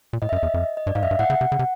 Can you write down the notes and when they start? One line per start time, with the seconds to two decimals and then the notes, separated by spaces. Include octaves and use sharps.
0.13 A#2
0.22 A2 D#5
0.29 E5
0.32 F#2
0.37 D#5
0.43 E2
0.54 F2
0.77 D#5
0.87 G2 D5
0.95 G#2 F5
1.03 F#2 E5
1.11 G2
1.19 A2 F#5
1.30 C#3
1.41 C3
1.52 C#3
1.59 C3